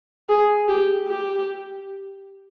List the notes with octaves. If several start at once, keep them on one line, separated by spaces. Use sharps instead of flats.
G#4
G4
G4